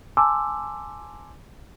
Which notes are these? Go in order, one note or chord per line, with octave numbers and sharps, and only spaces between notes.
G#5 A5 C6 D6 E6